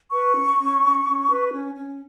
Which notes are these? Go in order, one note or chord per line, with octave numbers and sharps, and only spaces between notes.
B4 C#6
C#4
C#4
C#4
C#4
B4
C#4
C#4